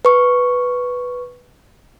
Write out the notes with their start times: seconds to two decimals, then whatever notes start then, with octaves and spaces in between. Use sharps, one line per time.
0.05 B4 C#6